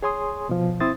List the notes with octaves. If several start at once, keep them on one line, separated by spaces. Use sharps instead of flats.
G#4 C#5 G#5 C6 D#6
B2 F3
C4 E4 C5 D#6 A6